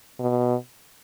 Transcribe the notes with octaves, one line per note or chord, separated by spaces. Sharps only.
B2